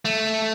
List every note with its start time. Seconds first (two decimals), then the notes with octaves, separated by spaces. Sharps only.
0.05 A3